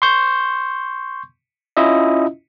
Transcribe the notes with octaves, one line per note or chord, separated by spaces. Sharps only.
C6 C#6 G6
C#4 E4 F4 D#5 E5